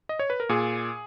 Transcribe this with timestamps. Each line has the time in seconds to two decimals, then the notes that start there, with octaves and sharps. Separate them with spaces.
0.09 D#5
0.19 C#5
0.30 B4
0.40 A#4
0.49 A#2 G#4